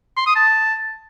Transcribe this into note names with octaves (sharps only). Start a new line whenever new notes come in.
C6
D#6
A5